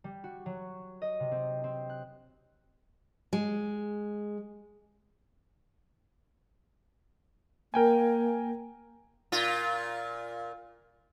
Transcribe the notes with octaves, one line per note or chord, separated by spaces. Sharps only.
G3
F#4
F#3
D#5
C3
C4
C4
F#6
G#3
A#3 A#4 G5 G#5
A#2 F4